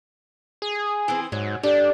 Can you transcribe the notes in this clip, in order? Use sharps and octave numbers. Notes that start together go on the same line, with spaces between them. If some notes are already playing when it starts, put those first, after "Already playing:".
G#4
E3 C4
G#2 F#3
G3 D4 A4